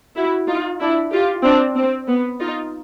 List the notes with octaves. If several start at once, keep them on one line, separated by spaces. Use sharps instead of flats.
E4 F#4
D#4 F4
D4 E4
F4 G4
C4 D4
C4
B3
D#4 F4